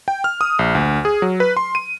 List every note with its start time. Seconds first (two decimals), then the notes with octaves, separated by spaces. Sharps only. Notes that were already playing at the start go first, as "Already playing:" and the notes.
0.08 G5
0.24 F6
0.41 D#6
0.59 A#1
0.75 D2
1.05 G#4
1.22 F#3
1.40 B4
1.57 C6
1.75 D#7